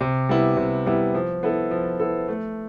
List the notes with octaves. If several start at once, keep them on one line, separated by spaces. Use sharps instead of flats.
C3
G3 B3 E4
C3
G3 B3 E4
F3
B3 E4 A4
F3
B3 E4 A4
A3